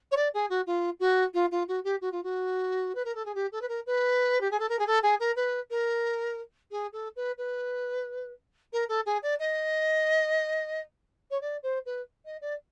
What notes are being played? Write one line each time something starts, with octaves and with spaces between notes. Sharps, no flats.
C#5
D5
G#4
F#4
F4
F#4
F4
F4
F#4
G4
F#4
F4
F#4
B4
A#4
A4
G#4
G4
A4
B4
A#4
B4
G4
G#4
A4
A#4
G#4
A4
G#4
A#4
B4
A#4
G#4
A4
B4
B4
A#4
A4
G#4
D5
D#5
C#5
D5
C5
B4
D#5
D5